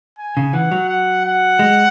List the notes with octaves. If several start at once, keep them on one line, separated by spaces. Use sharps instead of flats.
G#5
C#3
E3 F#5
F#3
F#5
F#5
G#3